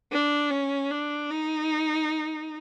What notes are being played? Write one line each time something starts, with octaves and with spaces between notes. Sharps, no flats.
D4
C#4
D4
D#4